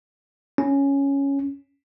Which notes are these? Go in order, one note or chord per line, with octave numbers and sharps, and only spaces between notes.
C#4